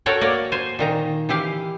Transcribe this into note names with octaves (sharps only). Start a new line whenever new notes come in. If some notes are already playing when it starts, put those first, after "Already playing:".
F#4 A4 A#4 C#5 F#5 G5
A#3 A#4 C#5 D5
C5 G#5
A#2 D#3 A#5
E3 E4 G4 F5